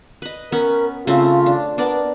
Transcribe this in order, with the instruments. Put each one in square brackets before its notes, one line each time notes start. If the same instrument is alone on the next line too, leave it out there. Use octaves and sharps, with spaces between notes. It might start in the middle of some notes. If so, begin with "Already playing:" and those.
[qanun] B4 D#5
[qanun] B3 C#4 [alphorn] A#4
[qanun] C#3 A3 C4 [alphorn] F4
[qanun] D4
[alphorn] B3 [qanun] D4 A#4 D5